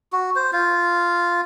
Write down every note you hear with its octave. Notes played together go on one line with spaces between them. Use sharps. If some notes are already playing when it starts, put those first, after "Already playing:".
F#4
C5
F4